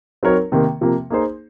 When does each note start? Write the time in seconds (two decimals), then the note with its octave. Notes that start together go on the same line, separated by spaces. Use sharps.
0.23 F#3 C4 D#4 A#4 C#5
0.52 C3 D#3 A#3
0.81 C3 F3 A#3
1.10 A#3 D#4 G#4 C5